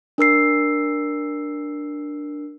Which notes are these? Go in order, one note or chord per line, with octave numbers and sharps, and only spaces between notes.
D4 A#4 E6 C7